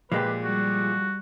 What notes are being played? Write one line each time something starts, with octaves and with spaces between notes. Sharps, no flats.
A#2 F3 G#3 G4 B4
G3 F#4